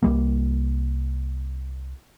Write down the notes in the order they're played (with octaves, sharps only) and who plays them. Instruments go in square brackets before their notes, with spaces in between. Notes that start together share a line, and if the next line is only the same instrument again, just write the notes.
[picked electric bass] C2 G3 A#3